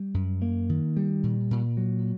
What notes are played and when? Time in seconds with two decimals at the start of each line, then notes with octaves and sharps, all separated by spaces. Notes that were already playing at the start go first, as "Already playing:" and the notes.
Already playing: G3
0.14 F#2
0.42 A#3
0.69 D#3
0.97 G3
1.23 A#2
1.51 A#2
1.77 F#3